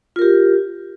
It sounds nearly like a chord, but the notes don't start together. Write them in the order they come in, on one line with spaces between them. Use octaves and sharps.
F4 A#4 G4